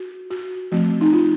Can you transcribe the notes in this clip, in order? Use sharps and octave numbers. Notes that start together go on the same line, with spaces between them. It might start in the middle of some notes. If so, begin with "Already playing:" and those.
Already playing: F#4
F#4
F3 A3 C4 F#4
D#4
F4